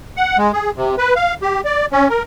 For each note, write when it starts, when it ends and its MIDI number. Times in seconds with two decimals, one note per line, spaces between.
0.17 0.37 78
0.38 0.52 56
0.53 0.71 68
0.76 0.95 48
0.98 1.14 71
1.16 1.34 77
1.42 1.61 67
1.65 1.86 74
1.92 2.08 61
2.10 2.23 70